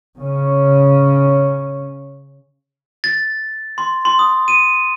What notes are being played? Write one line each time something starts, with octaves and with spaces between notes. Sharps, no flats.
C#3 C#4
A6
C6
C6
D#6
D#7